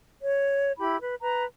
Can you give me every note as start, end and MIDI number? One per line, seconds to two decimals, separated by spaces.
0.21 0.71 73
0.78 0.96 64
0.78 0.96 67
0.78 0.96 83
1.00 1.14 71
1.21 1.44 71
1.21 1.44 82